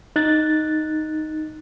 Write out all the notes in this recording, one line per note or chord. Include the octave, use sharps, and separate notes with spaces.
D#4 F#6 A6